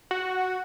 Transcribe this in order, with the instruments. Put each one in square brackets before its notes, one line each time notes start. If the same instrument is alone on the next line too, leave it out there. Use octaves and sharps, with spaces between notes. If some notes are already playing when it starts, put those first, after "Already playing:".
[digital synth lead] F#4